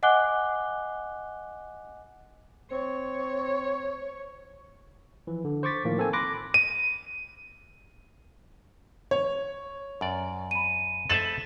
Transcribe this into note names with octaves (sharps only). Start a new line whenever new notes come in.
D#5 F#5 G#5 D6 F#6 G7
C4 C#5
E3 F3
D3
C5 C#6 D6 A6 B6
A2 D#3 F3 A#3
C4 A4 A#4 G#5
B5 C6 D6 F#6 A#6
D#7
C#5
F#2 D5
B5 D#7
A4 C5 E5 A6 E7 F#7